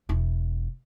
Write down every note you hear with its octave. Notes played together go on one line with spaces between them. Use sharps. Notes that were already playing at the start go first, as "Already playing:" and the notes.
E1 E4